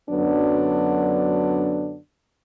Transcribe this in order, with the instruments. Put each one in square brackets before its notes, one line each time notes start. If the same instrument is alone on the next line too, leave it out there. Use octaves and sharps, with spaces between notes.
[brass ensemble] F#2 D3 F#3 B3 D4